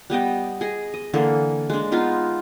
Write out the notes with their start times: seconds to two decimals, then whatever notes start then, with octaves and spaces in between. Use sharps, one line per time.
0.10 G3 B3 D#5 G5
0.61 G#4 D#5
0.94 D#5
1.14 D3 E3 A#3 A4
1.70 G#3 D4
1.92 B3 D#4 F4 C6